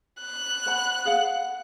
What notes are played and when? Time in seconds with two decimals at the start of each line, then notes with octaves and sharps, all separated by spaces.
0.22 F#6
0.66 C5 F#5 B5
1.05 G#4 F5 F#5